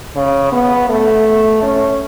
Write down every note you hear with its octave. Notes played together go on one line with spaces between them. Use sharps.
C#3
B3
A3
C#4